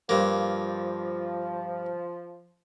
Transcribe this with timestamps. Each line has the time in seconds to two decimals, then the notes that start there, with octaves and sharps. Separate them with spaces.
0.09 G2 F3 A#3